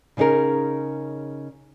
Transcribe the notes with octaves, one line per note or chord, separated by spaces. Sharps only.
C#3 C#4 D#4 G#4 A#4